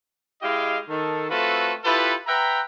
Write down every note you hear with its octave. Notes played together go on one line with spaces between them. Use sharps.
G#3 E4 G4 D#5 F5
D#3 A4
A3 C4 F4 F#4 A4 B4
E4 F4 G4 A4 B4
B4 E5 F#5 G5 A#5